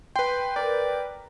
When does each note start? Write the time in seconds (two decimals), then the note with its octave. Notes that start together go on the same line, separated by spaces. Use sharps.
0.16 B4 G5 C6
0.56 A#4 D5